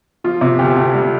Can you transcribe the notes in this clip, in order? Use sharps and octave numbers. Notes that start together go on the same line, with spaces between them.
F3 F4
C3
D2 G4
D2
G3